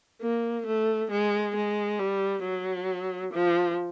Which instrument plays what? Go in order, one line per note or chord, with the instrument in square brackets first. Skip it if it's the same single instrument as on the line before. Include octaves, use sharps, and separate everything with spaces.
[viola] A#3
A3
G#3
G#3
G3
F#3
F3